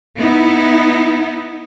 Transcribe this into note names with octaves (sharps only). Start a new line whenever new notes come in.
B3 D#4 E4